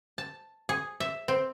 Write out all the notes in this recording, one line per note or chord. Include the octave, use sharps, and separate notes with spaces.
A5
G#4
E5
C4